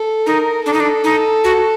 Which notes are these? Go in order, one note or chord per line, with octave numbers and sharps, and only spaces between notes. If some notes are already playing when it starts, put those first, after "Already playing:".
Already playing: A4
D#4 A#4
D4 A4
D#4
D4
D#4
F#4